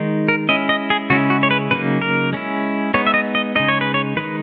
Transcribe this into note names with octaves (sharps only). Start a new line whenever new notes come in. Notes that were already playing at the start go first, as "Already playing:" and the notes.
Already playing: D#3 G#3 D#4
A#4
G#3 C#4 E4 D#5
D#5
G#4
C#3 G#3 C#4 E4 F#4
F#4
C#5
B4
C#3 F#3 A#3 D#4 B4
A#4
G#3 C#4 E4
G#3 B3 D#4 C#5
E5
D#5
D#5
C#3 G#3 D#4 D#5
C#5
B4
C#5
D#3 G#3 D#4 B4